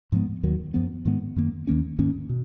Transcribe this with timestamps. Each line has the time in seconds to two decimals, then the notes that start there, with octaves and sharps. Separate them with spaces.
0.12 G#2 F3 G#3 B3
0.43 D#2 D#3 F#3
0.74 F#2 F3 B3
1.05 G#2 D#3 G#3 B3
1.36 F#2 D#3 A#3
1.67 D#2 D#3 A#3 C#4
1.99 G#2 D#3 A#3 C#4
2.29 B2